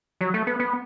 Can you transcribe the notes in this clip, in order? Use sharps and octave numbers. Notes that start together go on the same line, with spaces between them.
F#3
A3
B3
B3